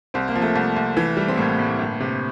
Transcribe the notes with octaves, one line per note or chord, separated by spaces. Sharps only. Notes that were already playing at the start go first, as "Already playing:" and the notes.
C2 C4
A#3
F3
A3
C2
C2
E3
G3
C4
A2 A#3
A2
G1
C3